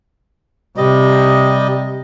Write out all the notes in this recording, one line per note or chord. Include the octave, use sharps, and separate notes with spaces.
C3 G3 D#5